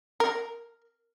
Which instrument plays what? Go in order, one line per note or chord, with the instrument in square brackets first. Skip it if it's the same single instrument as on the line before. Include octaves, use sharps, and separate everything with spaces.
[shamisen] A#4